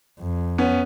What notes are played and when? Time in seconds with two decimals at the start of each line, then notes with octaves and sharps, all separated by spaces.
0.20 F2
0.58 B3 C#4